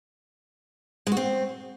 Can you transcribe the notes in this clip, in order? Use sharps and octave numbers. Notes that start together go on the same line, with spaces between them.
G#3
F#4
C4